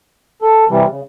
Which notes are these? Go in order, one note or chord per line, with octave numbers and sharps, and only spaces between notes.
A4
C3 E3 G3
C#3